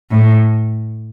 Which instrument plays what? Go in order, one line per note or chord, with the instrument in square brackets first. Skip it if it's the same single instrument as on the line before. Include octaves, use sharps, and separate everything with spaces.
[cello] A2